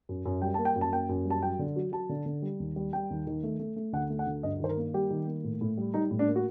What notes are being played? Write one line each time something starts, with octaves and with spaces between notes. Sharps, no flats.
F#2
F#2
G3 G5
A#3 A5
G5
F#2
A5
A#3 G5
F#2
G3
A5
F#3 G5
D3
F#3
F#3 A5
D3
D3
G3
D#2
G3
G3 G5
D#2
D#3
A3
A3
A3
D2 F#5
A3
F#5
D2
G2 D#5
D#3 C5
A#4
A#3
G3 G4
D#3
A#3
A2
A2
G3
G3 D#4
A2
D4
A#3
F#4